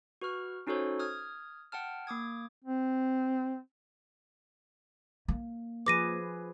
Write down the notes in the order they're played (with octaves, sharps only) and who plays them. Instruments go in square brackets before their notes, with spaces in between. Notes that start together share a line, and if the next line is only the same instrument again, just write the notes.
[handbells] F#4 B4 C#6 F6
C#4 D#4 F#4 A4 C5 C#5
D#6 F6 G#6
F#5 G5 A5 F6
A#3 D6 D#6 G#6
[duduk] C4
[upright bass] A#3
[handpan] F3 G#4 B4 [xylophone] D6 A#6 D#7